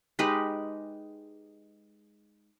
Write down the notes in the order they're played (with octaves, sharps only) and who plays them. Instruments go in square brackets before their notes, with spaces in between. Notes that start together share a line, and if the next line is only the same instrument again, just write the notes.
[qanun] G#3 D#4 G4 B4